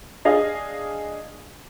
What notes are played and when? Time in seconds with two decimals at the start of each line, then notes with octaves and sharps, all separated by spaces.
0.25 D4 G#4 D#5 F5